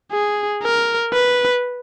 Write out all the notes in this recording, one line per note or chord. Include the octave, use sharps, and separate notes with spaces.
G#4
A#4
B4